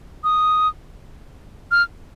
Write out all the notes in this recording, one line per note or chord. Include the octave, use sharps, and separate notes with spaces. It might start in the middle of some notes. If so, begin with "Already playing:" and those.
D#6
F6